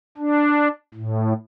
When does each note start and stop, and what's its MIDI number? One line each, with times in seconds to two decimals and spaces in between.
0.18 0.68 62
0.94 1.33 45